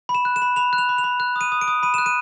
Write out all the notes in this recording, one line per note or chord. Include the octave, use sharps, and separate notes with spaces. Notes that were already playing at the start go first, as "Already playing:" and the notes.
B5
E7
F#6
E7
B5
B5 F7
F#6
F7
B5
F7
B5
F#6
D#6 D#7
D#6
D7
D#6
B5 D#7
F#6 E7
D#7